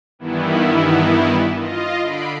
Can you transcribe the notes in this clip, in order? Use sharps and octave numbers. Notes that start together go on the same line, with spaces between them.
G2 D#3 E3 B3 E4
F4 D#5
D3 B5 C7 D7